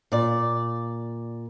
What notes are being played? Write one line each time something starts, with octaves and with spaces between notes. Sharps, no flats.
A#2 D5